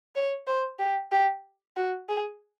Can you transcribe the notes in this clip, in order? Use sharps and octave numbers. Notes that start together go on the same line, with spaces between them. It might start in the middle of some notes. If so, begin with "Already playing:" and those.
C#5
C5
G4
G4
F#4
G#4